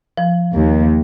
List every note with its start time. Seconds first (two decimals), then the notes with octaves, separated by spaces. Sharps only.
0.17 F3
0.54 D#2